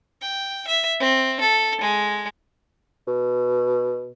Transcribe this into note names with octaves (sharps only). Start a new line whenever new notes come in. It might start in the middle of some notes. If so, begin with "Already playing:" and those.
G5
E5
C4
A4
G#3
B2